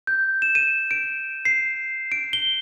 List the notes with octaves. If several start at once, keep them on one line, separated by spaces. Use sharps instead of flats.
G6
E7
D#7
D7
C7
D7
G7